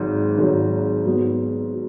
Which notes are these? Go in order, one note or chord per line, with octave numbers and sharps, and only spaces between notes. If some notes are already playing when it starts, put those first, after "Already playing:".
Already playing: G#1 G#2 F#3
G#1 G#2 F#3
G#2 F#3 B3 F#4
F#4